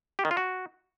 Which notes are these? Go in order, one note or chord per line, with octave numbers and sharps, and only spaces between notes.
G4
D#3
F4
F#4